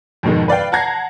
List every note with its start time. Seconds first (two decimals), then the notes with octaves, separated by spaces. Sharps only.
0.23 F2 G#2 B2 D#3 G#3
0.48 B4 D5 F5 G5
0.72 F#5 A5 A#5 G#6 A#6 C7